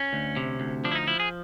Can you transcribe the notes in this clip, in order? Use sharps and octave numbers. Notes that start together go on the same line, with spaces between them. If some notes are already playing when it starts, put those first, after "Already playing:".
Already playing: C#4
D2
C3
D2
F3 D4
E4
D#4
F3 E4
G#4